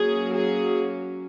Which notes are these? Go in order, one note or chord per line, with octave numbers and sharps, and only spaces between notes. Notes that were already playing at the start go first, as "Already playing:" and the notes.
Already playing: F#3 A#3 C#4 G#4
G#4